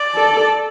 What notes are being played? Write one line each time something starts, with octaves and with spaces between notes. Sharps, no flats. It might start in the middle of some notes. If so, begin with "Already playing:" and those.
Already playing: D5
A4